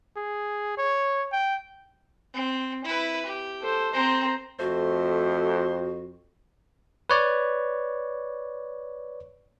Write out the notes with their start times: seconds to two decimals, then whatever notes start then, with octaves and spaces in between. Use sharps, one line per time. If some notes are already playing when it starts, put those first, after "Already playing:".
0.16 G#4
0.78 C#5
1.32 G5
2.34 C4
2.84 E4 B4
3.26 G4
3.62 A4 C5
3.93 C4 C5 A#5
4.59 F2 A3 F#4 C5
7.10 B4 C#5 D5